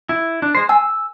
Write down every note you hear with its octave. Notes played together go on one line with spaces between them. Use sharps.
E4
D4
G#3 C5
G#5 E6